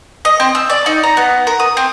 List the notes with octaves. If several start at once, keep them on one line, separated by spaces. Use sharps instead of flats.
D#5
C4
E6
D5
D#4
A#5
B3
A#4
D#6
C4